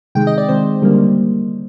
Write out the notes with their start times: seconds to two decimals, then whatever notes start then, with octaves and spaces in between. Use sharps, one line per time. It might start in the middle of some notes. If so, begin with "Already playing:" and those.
0.15 C3 D#3 G#3 G5
0.27 D#5
0.38 D5
0.49 C3 D#3 G#3 C5
0.82 D3 G3 A#3